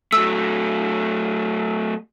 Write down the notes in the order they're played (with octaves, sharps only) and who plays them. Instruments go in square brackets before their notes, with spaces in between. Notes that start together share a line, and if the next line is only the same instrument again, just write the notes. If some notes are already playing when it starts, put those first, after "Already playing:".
[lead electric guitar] F#3 A3 [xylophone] E6